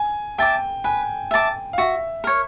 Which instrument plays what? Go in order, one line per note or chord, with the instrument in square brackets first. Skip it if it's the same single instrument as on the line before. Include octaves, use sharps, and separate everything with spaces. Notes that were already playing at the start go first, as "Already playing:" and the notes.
Already playing: [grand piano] G#5
[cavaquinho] E5 A5 D6 [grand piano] G5
[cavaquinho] B4 [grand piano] G#5
[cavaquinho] E5 A5 D6
[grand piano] F5
[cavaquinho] F#4 [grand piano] E5
[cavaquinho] A#4 C#5